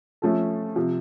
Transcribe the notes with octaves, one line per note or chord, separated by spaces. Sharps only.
F3 A3 C#4 A4
C3 F3